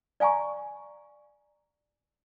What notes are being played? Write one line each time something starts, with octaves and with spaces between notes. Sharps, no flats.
D5 F5 G#5 A#5 C#6